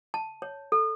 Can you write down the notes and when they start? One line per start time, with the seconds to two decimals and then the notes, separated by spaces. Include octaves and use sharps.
0.14 A5
0.42 C#5
0.72 A4